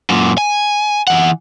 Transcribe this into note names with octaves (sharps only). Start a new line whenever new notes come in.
F#2 A#2
G#5
E3 F#5